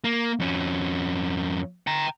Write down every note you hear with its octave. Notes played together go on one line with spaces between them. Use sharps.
A#3
F2 C#4
G5 A#5